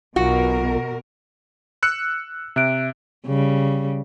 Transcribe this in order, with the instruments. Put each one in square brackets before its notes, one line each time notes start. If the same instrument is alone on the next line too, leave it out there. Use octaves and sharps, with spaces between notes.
[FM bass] B1 [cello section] B2 A#4 [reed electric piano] F4 [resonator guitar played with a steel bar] F#4
[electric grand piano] E6 F#6 C#7
[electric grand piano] C3 [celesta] E5 F#6 D7
[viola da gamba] C#3 G3